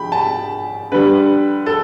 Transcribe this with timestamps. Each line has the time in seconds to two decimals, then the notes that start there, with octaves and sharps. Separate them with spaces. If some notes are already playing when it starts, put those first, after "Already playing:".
Already playing: G5 B5
0.12 A5
0.92 D3 G3 B4
1.66 A4